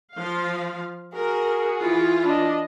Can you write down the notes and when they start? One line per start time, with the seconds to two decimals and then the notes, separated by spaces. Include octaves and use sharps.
0.16 F3 F5
1.16 F#4 G#4 A#4
1.82 E3 E4 F4
2.25 D4 D#5